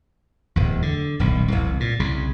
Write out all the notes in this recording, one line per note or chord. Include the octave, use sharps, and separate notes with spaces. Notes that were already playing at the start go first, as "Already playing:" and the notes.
D1 E2
D3
D#1 B1
E1 C2
A#2
C2 C#3